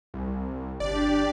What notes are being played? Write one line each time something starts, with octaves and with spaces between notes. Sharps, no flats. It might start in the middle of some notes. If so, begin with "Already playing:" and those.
C2
G1 D4 G4 D5